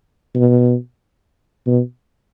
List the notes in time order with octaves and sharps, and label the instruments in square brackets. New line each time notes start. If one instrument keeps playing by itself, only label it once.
[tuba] B2
B2